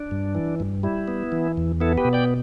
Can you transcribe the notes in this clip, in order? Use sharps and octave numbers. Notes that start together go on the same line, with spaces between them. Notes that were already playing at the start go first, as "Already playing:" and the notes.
Already playing: D4
G2
E3
G2
G3 E4
B3
E3
E2
B3 E4 A4
G4 B4
B2
D5 G5